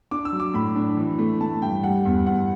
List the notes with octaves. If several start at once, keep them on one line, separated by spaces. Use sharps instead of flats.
D4 D6
E6
F#3
D6
A2 B5
D4
E3
A3
A3 A5
G2 G5
G3 F#5
E2
E2 F#5